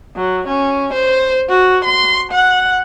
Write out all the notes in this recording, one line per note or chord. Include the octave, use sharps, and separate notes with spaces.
F#3
C#4
C5
F#4
C6
F#5